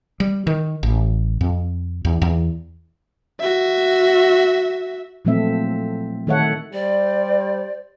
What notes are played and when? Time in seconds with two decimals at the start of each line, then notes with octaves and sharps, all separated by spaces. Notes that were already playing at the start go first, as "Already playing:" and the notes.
0.20 G3
0.47 D#3
0.83 A1
1.41 F2
2.05 E2
2.22 E2
3.40 F#4 E5
5.25 A#2 F3 F#3 A3 C4 E5
6.27 D#3 A3 A4 C#5 E5 F#5
6.73 G3 C5 D5